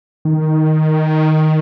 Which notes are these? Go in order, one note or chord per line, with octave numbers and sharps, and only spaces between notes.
D#3